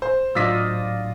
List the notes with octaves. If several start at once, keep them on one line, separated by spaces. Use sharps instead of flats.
C5
A2 F#3 D4 F4 D5 D#5 E6 B6